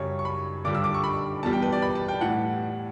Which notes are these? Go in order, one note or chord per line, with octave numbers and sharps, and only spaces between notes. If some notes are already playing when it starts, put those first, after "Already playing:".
Already playing: F#2 C#3 G3 C#5
C#6
B5
G2 D3 G3 D6
E6
D6
C#6
B5
E2 B2 G3 A5
G5
B4
D5
B5
A5
G5
A2 E3 G3 F#5